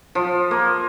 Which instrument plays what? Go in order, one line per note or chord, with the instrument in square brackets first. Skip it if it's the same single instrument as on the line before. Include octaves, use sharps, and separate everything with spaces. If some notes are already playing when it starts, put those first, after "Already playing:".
[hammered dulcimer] F3
A#3